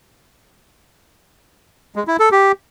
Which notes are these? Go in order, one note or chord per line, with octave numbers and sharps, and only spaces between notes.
G#3
E4
A4
G4